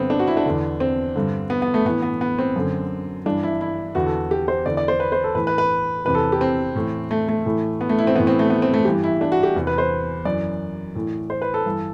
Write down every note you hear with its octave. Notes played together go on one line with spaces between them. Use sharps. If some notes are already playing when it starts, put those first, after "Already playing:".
Already playing: G2 D3 B3 C4
D4
F#4
E4
D4
E2 D3
C4
G2 D3
B3
B3
A3
A2 E3 B3
B3
B3
C4
F#2 D3
G2 E3 D4
E4
E4
E2 D3 F#4
A4
G4
C5
E2 D3 D5
D5
C5
B4
C5
A4
A2 E3 B4
B4
B4
E2 C3 E3 B4
A4
G4
C4
A2 E3
A3
A3
A2 E3
B3
A3
E4
C4
A2 E3 B3
C4
A3
B3
C4
A3
G2 E3 G4
E4
D4
F#4
G4
E2 C3 E3
B4
C5
F#2 E3 D5
A2 E3
C5
B4
A4
G2 E3